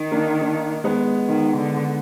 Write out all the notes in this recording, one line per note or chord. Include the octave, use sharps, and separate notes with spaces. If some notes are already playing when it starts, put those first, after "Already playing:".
Already playing: D#3
A#3 D4
A#3 D4
G#3 B3
D#3
D3